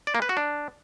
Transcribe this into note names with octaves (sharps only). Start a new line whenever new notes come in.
D5
A#3
B4
F#4
D4